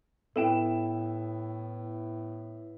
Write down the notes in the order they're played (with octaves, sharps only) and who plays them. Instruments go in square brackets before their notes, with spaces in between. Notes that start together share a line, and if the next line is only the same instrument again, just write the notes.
[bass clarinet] A2 [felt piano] B3 E4 E7 [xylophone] A4 G5